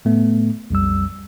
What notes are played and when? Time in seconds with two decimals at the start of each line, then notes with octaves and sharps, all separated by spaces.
0.05 A2 A3 B3
0.70 B1 F2 G3 E6